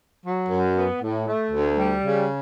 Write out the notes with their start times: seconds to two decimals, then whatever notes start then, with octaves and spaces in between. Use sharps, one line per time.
0.23 F#3
0.49 F#2
0.76 B3
1.01 A2
1.26 A3
1.51 D2
1.78 G3
2.03 C#3